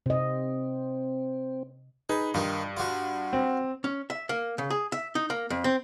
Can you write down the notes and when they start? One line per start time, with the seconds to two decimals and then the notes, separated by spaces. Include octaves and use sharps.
0.06 C3 C4 D#5
2.09 D#4 G#4 B4
2.34 G2 D#3 F4
2.77 F4 F#4
3.33 C4
3.84 C#4
4.10 E5
4.29 A#3
4.58 C#3
4.70 G#4
4.92 E5
5.15 D#4
5.30 A#3
5.50 F2
5.64 C4